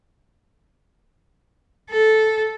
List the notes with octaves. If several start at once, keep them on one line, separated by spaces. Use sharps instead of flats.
A4